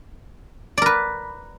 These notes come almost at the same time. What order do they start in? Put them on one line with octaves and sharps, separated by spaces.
D5 A#4 B4